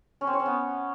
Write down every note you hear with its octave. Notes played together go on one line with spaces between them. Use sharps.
C#4
C4
C#5
C#4
B3